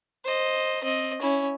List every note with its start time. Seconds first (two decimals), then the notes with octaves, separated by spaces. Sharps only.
0.25 C5 D#5
0.84 C4 D#5
1.21 C#4 E4